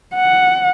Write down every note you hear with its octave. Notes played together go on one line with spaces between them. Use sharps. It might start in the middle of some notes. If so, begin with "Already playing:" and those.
F#5